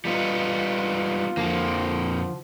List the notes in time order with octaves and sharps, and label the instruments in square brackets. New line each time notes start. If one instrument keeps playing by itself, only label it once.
[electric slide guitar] G3 B3 D#4 [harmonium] F4
[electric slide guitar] F2 A#3 [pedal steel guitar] D3 F3